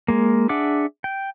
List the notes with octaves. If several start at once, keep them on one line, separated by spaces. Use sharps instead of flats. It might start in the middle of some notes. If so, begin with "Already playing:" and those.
G#3 A#3
D4 G#4 E5 F#5 D6
G5